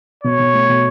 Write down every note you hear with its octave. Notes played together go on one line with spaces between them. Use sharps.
B2 C#5
B2
A3
B2